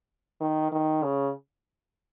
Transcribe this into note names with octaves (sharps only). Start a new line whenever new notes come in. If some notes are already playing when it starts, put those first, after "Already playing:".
D#3
D#3
C#3